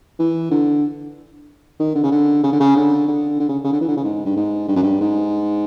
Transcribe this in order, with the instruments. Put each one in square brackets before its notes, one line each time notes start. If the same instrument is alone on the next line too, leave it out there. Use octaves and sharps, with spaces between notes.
[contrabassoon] E3
D3
D#3
D3
C#3
D3
C#3
D3
C#3
D3
D3
D3
C#3
C#3
D3
E3
D3
C#3
G#2
G2
G#2
G2
F#2
G2
G#2